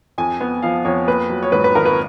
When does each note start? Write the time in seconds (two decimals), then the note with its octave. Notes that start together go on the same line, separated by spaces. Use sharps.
0.18 F2 G#5
0.40 B3
0.62 F3 F5
0.85 F2 C#5
1.07 A#3 B4
1.30 F#3
1.43 C#5
1.52 G#2 B4
1.64 B4
1.75 G#1 A#4
1.85 B4